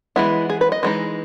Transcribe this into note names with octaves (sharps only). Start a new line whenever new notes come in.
E3 G#3 B3 E4
G#4
B4
D#5
E3 G#3 D#4